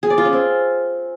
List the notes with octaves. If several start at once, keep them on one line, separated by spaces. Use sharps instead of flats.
G#4
D5
F4
C#4
C4